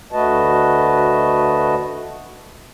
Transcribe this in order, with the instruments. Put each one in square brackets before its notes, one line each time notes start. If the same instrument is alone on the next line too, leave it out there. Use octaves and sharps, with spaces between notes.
[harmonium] D2 A3 F#4 B4 D#5 A5